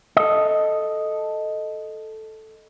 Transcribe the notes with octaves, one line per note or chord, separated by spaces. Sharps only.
A4 D#5